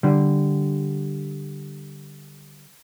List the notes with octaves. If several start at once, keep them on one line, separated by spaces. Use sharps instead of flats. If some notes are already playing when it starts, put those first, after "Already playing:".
D3 G3